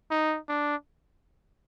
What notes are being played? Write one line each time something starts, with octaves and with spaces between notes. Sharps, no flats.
D#4
D4